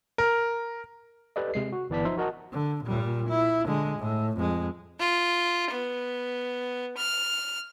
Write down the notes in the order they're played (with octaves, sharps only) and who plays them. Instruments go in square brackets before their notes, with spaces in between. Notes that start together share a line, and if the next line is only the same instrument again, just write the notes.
[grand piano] A#4
[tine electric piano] G4 A4 B4 D5 D#5
C3 G#3 C7
F#4
G1 E3 B3 D5 A5 B6
F3 D#4 E5 C6
F#4 A#4 D#5 F#5 A5
[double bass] D3
A#2 G3
E4
D3 G#3
A2
F2 G#3
[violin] F4
B3
F6